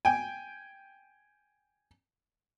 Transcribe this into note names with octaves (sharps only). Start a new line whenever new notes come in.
G5 G#5